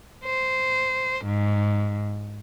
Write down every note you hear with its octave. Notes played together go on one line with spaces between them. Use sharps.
C5
G#2